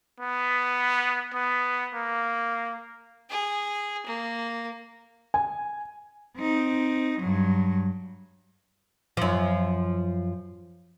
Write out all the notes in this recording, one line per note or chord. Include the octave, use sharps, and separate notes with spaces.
B3
B3
A#3
G#4
A#3
G#5
C4 D#4
G2 F#3
F#2 F3